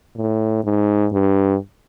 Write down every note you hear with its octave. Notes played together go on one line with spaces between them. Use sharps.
A2
G#2
G2